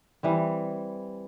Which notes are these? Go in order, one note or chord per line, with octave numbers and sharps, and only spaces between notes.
E3 G3 C4